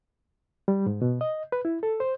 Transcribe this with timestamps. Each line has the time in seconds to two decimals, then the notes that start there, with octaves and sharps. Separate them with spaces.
0.68 G3
0.86 G#2
1.02 B2
1.21 D#5
1.52 B4
1.65 E4
1.83 A4
2.00 C5